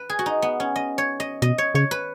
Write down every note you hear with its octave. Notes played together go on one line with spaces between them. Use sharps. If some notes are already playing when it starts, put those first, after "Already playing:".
Already playing: B4
G#4
F#4
D#4
B3
C#4
D#5
C#5
D#5
B2 D#5
C#5
C#3 C#5
B4